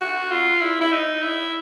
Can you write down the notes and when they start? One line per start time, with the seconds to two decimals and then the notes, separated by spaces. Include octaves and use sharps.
0.01 F#4
0.31 F4
0.61 E4
0.81 E4
0.92 D#4
1.22 E4